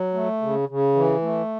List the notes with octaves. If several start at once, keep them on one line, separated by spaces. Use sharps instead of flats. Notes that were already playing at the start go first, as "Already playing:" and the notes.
Already playing: F#3
A3
C#3
C#3
E3
A3